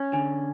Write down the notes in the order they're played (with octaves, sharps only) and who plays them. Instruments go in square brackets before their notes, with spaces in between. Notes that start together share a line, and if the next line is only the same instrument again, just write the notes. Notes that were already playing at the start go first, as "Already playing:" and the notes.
Already playing: [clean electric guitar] C#4
[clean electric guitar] D3 [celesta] G#5